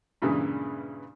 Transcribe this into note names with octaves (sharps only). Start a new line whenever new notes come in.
G2 A#2 C#3 E3 G#3